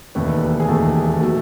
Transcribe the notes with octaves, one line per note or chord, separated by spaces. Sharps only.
E1 D#2 D#3 A3 B4
G#4
E1 D#2 D#3 A3 A4
B2 F#3 A3